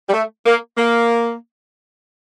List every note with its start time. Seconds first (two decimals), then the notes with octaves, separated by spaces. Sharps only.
0.09 G3
0.13 A3
0.46 A#3
0.77 A#3